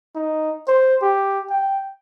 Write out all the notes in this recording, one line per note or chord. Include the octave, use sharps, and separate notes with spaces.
D#4
C5
G4
G5